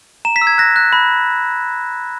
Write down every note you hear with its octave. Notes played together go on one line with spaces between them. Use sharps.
A#5 E7
B6
E6
G#6
F#6 A#6
F#6
B5